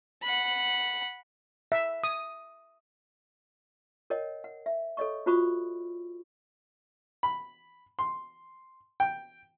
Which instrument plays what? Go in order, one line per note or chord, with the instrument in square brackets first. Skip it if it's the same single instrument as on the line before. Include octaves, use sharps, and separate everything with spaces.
[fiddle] F#5 B5
[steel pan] E5
D#6
[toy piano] A#4 C#5 D#5 G5
F#5
E5
A4 C#5 D#5 C#6
F4 F#4 C5 B5 C#6 D#6
[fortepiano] B5
C6
G5